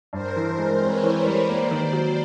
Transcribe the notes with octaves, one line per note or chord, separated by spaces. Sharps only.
G2 A#4 C5
E3
G#3
C4 B4 C#5
E3
G3
A#3 C5 D5
D#3
F#3